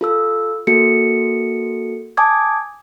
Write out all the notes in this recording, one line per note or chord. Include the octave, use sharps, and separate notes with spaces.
F4 A4 E6
A#3 F#4 A4 C#7
G#5 A5 D6 D#6 G#6